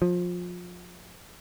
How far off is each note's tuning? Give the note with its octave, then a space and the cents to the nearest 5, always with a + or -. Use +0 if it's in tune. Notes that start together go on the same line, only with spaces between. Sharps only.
F3 +25